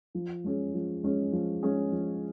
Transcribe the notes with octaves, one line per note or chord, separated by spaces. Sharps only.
F3
G#3 C#4 G#4
F3
G#3 C#4 G#4
F3
G#3 C#4 G#4
F3